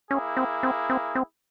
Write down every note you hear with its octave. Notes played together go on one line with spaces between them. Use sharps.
A#3 C#4 E4 G#4
C4
C4
C4
C4